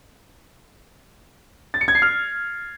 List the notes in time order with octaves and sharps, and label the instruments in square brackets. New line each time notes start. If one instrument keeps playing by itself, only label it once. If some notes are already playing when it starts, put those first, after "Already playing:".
[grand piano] A6
C#7
G#6
C7
F6